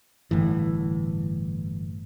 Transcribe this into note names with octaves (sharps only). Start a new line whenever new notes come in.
G1 A2 E3